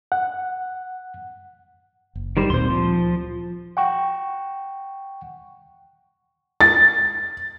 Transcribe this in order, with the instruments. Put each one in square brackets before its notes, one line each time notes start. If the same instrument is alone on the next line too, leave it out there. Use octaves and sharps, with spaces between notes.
[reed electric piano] F#5
[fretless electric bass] F#1
[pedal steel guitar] D#3 G3 C5
[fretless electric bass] D2 A#2 C4 [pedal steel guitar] C5 C6
[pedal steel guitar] F3
[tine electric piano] F#5 G5 C#6
[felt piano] A6